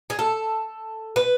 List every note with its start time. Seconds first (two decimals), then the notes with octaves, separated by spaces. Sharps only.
0.10 G#4
0.19 A4
1.16 B4